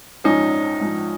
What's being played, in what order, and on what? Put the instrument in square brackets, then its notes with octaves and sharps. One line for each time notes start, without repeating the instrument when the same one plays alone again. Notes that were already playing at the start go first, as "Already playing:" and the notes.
[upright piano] A#1 G#2 F3 C#4 D#4
A#1 G#2 F3